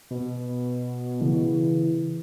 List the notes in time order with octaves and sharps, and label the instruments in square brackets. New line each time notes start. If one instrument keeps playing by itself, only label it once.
[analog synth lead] B2
[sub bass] C#3 [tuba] E3